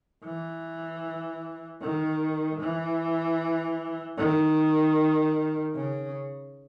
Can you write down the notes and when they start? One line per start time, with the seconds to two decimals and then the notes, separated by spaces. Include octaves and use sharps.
0.25 E3
1.82 D#3
2.60 E3
4.17 D#3
5.75 C#3